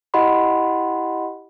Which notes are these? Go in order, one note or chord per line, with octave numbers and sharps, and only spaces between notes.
E4 G4 D#5 F#5 B5 C6